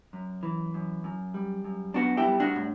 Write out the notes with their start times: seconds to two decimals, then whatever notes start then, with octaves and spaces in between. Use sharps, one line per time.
0.13 F#2
0.43 E3
0.74 F#2
1.04 F#2
1.34 G3
1.64 F#2
1.94 B3 D4 F#4
2.17 E4 G4
2.25 G3
2.40 D4 F#4
2.56 A2